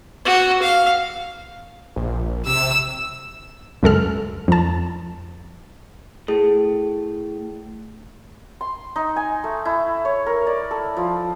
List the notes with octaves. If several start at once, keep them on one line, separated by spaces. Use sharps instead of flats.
F#4
F5
A#1
C3 E6
C#2 F#2 A4 F6
F2 A5
A2 G#4
C6
D#4
G#5
A3
E4
C#5
A#4
D5
A4
F3